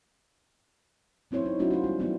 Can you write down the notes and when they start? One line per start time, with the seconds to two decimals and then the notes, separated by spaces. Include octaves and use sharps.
1.31 F#3 C4 E4 C5 C#5
1.46 D#4
1.59 F#3 A3 B3 C#4 E4 F#4
1.71 F4 C5
1.84 G3
1.99 F#3 A3 B3 E4